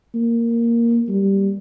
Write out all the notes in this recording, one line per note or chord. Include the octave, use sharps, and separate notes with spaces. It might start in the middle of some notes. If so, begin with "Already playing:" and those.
A#3
G3